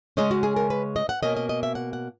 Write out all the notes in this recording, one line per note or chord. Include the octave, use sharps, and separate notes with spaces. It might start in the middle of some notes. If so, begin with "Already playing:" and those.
C#3 G#3 C#4 D#5
F#4
G#4
A#4
B4
D#5
F#5
B2 A#3 C#4 D#5
D#5
D#5
E5
F#5
F#5